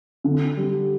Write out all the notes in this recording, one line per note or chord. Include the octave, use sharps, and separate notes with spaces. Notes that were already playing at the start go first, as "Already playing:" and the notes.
D3
G3